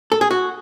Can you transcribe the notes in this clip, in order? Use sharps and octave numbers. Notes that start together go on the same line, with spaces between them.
A4
G#4
F#4